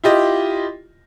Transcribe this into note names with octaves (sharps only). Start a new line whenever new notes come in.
E4 F4 G4 D#5